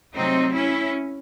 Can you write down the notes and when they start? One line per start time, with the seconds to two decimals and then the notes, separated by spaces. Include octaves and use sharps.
0.15 C3 F#3 A3 C4 D#4
0.53 C#4 E4